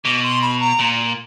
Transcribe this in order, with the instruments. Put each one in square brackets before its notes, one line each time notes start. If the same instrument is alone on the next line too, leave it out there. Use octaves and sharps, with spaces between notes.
[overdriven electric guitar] B2 [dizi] D6
[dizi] C6
B5
A#5
[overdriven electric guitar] A#2